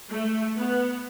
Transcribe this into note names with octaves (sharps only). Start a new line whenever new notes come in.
A3
B3